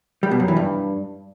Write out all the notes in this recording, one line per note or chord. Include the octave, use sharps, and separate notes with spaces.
G3
B2
F#2
E3
G2